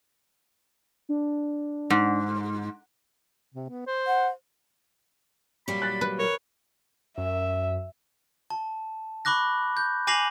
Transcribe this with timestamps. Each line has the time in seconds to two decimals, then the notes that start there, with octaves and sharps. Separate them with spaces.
1.09 D4
1.90 G#2
3.54 C3
3.69 B3
3.87 C5
4.07 F#5
5.68 A#2 F#3 G3 B5
5.82 F#6 A6
6.01 B4
6.19 A#4 C#5
7.18 F#2 E5
8.50 A5
9.25 B5 C#6 D6 F#6 A#6
9.77 G6
10.07 G#5 D6 A#6 C7 F7 F#7